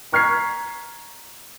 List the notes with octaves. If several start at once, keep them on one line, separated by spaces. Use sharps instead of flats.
A#5 C#6 F6 G#6 B6 C7